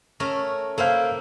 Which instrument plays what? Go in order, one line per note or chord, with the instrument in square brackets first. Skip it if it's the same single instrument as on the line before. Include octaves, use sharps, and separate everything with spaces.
[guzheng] A3 C#4 A#4
[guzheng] A#3 E4 G5 [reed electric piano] A4 C5 F5